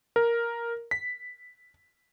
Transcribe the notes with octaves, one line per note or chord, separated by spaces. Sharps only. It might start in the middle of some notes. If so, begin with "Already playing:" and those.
A#4
B6